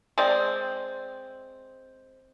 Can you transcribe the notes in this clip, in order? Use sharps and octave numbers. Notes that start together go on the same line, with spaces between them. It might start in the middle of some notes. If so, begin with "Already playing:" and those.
G#3 C4 D5